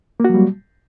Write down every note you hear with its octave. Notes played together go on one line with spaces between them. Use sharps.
F#3 G3 A#3 F#4